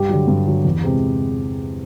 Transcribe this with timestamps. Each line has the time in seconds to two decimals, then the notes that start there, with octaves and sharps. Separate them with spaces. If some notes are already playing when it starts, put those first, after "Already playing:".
Already playing: G2 G4
0.09 D3 F#3
0.28 G2
0.47 D3 F#3
0.65 E2
0.84 C3 E3 G#3 C4